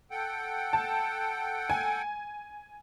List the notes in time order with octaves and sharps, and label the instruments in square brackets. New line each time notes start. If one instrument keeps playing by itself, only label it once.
[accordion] A4 F#5 G5
[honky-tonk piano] A5
G#5